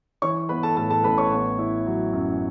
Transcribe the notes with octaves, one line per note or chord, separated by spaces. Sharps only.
E3 C#5 C#6
B3 B4 B5
A4 A5
A2 A4 A5
A4 A5
A1 B4 B5
C#5 C#6
B3
E4
F#3
F#2